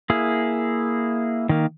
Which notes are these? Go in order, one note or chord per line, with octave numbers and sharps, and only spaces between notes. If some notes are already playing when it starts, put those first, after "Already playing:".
A#3 E4 G#4
D#3 A#3